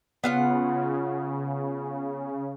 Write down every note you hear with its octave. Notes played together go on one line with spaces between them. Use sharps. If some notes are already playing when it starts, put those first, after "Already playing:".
C#3 B3 F4 F#5